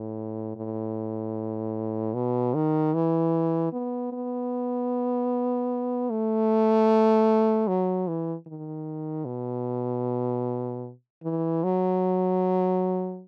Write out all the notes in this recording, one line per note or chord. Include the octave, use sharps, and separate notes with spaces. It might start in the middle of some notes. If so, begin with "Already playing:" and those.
Already playing: A2
A2
B2
D#3
E3
B3
B3
A3
F#3
E3
D#3
B2
E3
F#3